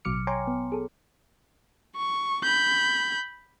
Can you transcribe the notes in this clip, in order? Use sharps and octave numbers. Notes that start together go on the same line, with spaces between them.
A1 B2 F#3 D6 F6 C#7
C#5 G5 G#5 A#5 C6 D6
B3
G#4 A4
C#6
B5 G6